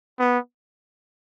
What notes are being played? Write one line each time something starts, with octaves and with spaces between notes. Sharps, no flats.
B3